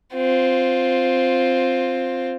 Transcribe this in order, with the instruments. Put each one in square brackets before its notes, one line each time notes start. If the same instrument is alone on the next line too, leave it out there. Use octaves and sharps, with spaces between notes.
[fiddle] C4 F4